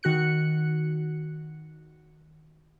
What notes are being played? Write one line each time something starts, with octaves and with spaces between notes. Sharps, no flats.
D#3 F#4 F#6 C#7